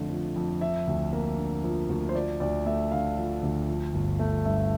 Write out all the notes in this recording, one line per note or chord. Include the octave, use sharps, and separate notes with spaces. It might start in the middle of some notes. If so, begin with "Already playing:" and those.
Already playing: F2 D3 A3
F3
F2
F3 E5
D2
A#3
D3
F3
D2
C5
F3 D5
D2 D5
A3 E5
D3 F5
F3
D2
F3
G1
A3
G2 E5